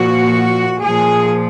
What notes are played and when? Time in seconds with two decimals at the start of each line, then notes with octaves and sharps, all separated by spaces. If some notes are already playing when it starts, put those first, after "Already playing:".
Already playing: A#2 F3 F#4
0.82 A#2 F3 G#4